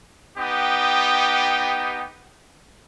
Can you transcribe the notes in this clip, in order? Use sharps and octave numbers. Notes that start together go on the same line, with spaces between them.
B3 D#4 G4 G5